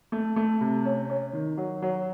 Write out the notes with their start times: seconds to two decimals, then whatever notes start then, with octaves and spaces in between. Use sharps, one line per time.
0.12 A3
0.36 A3
0.61 C3
0.85 C#4
1.10 C#4
1.33 D#3
1.57 F#3
1.82 F#3